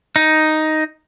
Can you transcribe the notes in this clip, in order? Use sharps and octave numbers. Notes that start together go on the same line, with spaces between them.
D#4